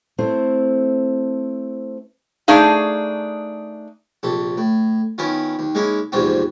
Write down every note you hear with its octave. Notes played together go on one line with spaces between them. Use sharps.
A3 C4 E4 C5
A3 D4 D#4 G#4 F5
A#1 C3 A4
A2
D#3 B3 C#4 E4 F4
D#2
G#3 A#3 C#4 D#4 E4
A#1 E2 G#2 C3 F4 F#4